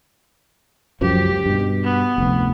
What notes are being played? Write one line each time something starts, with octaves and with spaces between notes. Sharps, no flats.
C#2 F#2 F3 G4
G2 B2
B3
F1 D2